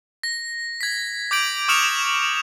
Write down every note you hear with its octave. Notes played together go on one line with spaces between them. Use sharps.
A#6
G#6 B6
D6 G6 G#6 D7 F#7
C#6 D#6 F6 C#7 E7 F7